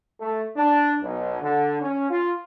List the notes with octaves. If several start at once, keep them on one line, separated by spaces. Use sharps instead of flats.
A3
D4
B1
D3
C#4
F4